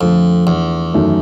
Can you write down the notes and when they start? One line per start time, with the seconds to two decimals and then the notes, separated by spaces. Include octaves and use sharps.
0.01 F2 D3 F3 A3
0.47 E2
0.94 F#2 D#3 F#3 A3